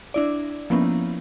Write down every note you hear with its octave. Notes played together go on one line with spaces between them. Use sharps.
D4 E4 D5
F3 A#3 B3 C#4 E4